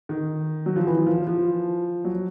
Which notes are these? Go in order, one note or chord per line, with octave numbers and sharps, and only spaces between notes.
D#3
F#3
F3
E3
F3
F3
F#3